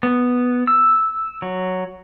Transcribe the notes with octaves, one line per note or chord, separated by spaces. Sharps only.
B3
E6
F#3